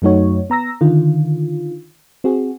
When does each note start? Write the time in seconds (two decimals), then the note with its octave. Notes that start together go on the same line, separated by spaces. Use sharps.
0.02 F#2 F#3 A3 D#4 F#4 C#5
0.50 B3 A#5 E6 A#6
0.81 D3 D#3 F4
2.24 C4 F#4 G#4